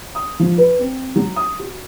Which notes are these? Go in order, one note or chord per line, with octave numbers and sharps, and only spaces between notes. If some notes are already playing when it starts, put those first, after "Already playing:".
D#6
F3
B4
C4
F#3
D#6
F#4